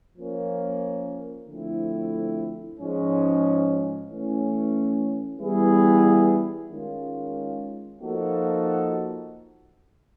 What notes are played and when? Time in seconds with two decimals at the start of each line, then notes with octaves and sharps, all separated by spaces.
0.17 F3 A#3 C#4
1.48 D3 F3 A3 C4 E4
2.79 G#2 F3 G#3 C#4
4.09 E3 A3 C#4
5.39 E3 G3 B3 E4 G#4
6.71 D#3 G#3 C#4 F4
8.01 F3 A#3 D#4 F#4 A4